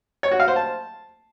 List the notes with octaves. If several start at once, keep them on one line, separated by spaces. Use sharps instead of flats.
C#5
F#4
F5
C5
A5